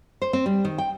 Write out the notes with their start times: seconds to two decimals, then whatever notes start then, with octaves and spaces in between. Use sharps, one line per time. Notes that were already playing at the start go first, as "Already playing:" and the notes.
0.22 C5
0.33 C4
0.46 G3
0.65 D#3
0.78 G5